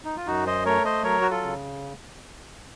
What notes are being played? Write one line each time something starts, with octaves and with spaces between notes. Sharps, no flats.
D#4
F4
F#2 D#4 F#4
C5 D#5
A3 A#4 C#5
C5 D#5
F#3 A#4 C#5
F#4
F4 A4
C#3